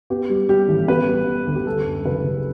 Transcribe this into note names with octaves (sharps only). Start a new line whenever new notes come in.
B3 G4
G3
G3 G4
A1
B3 B4
G3
B3
D2
G4
G3 A4
F#2
F#1 B4
C#3